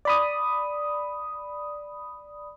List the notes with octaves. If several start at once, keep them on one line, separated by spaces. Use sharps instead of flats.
D5 B5 D#6